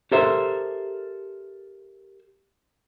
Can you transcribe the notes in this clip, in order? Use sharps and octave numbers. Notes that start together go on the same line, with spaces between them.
G4 A4 A#4 C5 E5